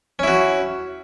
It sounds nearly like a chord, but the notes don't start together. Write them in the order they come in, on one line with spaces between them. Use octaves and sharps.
C#4 E4 F#4